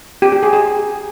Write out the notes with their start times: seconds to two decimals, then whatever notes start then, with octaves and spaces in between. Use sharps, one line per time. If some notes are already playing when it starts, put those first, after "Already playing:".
0.22 G4
0.32 G4
0.43 G#4
0.53 G#4